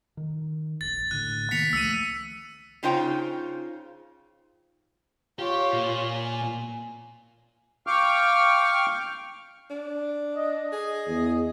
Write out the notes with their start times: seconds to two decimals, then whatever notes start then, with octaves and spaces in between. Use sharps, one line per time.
0.17 D#3
0.81 F1 A#1 A6
1.11 A2 D3 F#6
1.51 C3 D#3 A#3 B6 C#7 F7
1.73 C#2 F3 A3 E6 C#7 D#7
2.83 C#3 D#4 F4 C5 C#5 G5
5.39 F4 G4 C#5
5.73 A#2
6.11 G#5
7.87 F5 G5 C#6 D6 F6
9.70 D4
10.35 D#5
10.73 G#4
11.08 E2